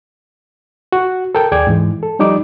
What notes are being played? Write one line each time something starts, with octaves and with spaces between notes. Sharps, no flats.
F#4
A4 A#4 G5
D#2 G#4 D5 G5 D6 G#6
G#2 E3 G#3
A4
F3 G3 D#4 D5 D6